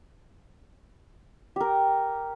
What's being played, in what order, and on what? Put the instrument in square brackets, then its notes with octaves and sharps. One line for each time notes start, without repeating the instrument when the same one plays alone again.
[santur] G4 A#4